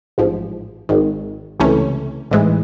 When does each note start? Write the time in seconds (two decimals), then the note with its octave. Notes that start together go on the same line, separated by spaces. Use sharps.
0.18 A1 G#2 F3
0.89 G#1 G#2 D#3
1.60 C#2 C3 E3 A3 C#4
2.31 A1 G#2 E3 G#3